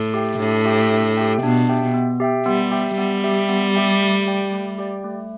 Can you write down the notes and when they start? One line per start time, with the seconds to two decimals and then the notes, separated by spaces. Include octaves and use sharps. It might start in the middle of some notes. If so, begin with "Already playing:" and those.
Already playing: A2
0.14 G4 E5 G5
0.39 A2 D4
0.65 G4 E5 G5
0.91 D4
1.17 G4 E5 G5
1.42 B2 D4
1.69 G4 E5 G5
1.94 B3
2.20 G4 E5 G5
2.46 G3 B3
2.72 G4 E5 G5
2.98 G3 B3
3.24 G4 E5 G5
3.49 B3
3.75 G4 E5 G5
4.01 A3
4.26 G4 D5 G5
4.52 A3
4.78 G4 D5 G5
5.04 A3